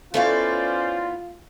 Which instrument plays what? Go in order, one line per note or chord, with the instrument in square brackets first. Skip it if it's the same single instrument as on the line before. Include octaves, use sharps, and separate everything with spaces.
[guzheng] A3 [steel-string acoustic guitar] B3 E4 F5 [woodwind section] C#4 C5 D5 [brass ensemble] F4